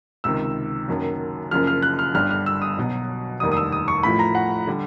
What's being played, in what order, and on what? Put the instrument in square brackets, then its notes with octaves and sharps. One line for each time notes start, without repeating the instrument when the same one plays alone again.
[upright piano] C#2 C3 D#3 E6
F#1 F#2 D#3 F#3
F#1 F#2 C#3 F3 F6
F6
F#6
F6
G1 G2 D3 G3 F6
F6
E6
D#6
B1 B2 F#3
F1 D#2 D#3 G3 D#6
D#6
E6
D#6
C#6
A1 A2 F3 B5
A#5
F#5
D3 G3